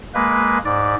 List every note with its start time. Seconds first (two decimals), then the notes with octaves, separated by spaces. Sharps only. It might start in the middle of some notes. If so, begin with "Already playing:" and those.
0.14 G#3 A#3 B4
0.65 G#2 D5